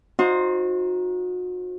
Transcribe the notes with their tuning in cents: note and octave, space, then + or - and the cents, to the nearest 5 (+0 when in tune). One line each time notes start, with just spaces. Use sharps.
D#4 +5 F#4 -35 C5 +10